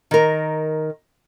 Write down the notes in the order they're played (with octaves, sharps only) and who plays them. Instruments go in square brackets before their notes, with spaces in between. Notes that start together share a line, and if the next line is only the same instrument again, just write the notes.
[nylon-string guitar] D#3 A#4